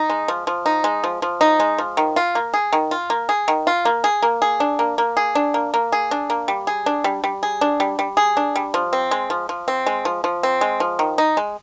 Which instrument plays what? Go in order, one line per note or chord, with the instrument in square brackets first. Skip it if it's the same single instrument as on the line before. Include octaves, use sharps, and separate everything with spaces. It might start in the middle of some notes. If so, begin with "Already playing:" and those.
Already playing: [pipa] D#4
G#3
F3
F3
D#4
G#3
F3
F3
D#4
G#3
F3
D#3
F4
A#3
G#4
D#3
F4
A#3
G#4
D#3
F4
A#3
G#4
A#3
G#4
D4
A#3
A#3
G#4
D4
A#3
A#3
G#4
D4
A#3
G3
G#4
D4
G3
G3
G#4
D4
G3
G3
G#4
D4
G3
F3
C4
G#3
F3
F3
C4
G#3
F3
F3
C4
G#3
F3
D#3
D#4
G#3